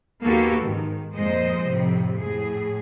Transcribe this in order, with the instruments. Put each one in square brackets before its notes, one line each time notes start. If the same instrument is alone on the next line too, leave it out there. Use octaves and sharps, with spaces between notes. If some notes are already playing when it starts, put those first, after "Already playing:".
[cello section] D#2 A#3 B3 F#4 G4 A4
G#2 D#3
F2 A#2 G#3 C5 D#5
F2 A2 C3
A2 G#4